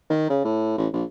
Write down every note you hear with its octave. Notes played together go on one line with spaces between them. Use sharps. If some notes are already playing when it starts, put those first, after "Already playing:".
D#3
C#3
A2
A1
A#1